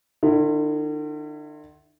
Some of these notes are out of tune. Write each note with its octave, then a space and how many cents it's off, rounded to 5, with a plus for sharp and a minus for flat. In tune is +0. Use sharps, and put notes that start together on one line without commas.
D3 +45 E4 +5